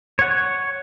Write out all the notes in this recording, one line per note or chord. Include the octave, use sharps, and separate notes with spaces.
C#5 F#5